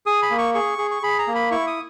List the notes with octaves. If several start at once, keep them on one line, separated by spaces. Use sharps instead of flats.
G#4 D#6
B5
A#3
C#6
G#4 C#6
G#4
C#6
G#4 B5
A#5
A#3
B5
E4 C#6
D#6